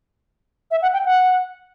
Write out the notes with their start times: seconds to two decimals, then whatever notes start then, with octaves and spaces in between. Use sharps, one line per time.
0.71 E5
0.82 F#5
0.93 G5
1.06 F#5